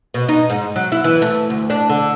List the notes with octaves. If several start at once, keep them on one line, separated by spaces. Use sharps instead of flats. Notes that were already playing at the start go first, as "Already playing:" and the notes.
B2
D#4
G#2
F#3
E4
E3
A3
D2
D4
D3